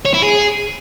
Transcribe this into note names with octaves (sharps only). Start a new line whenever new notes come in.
C#5
E4
G#4